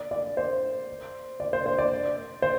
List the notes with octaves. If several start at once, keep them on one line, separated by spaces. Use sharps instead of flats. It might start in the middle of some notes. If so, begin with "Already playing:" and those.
Already playing: D5
D5
C5
D5
C5
C5
D5
C5